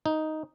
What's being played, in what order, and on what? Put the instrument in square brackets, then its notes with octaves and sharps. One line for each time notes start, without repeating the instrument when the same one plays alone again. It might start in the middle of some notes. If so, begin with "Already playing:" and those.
[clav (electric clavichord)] D#4